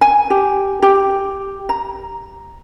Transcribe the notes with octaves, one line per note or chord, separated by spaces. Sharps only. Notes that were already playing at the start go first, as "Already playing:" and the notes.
G#5
G4
G4
A#5